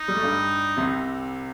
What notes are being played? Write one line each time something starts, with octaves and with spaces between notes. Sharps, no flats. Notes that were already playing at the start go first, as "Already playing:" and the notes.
Already playing: D#4
G3
A3
G2 G3
C2 C3